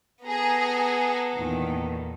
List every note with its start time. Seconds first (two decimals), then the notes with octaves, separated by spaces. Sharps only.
0.24 B3 G#4 A4 A#5
1.34 E2 A#2 D#3